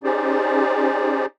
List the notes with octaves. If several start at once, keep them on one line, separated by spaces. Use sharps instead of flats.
C#4 D#4 G4 G#4 C5 D5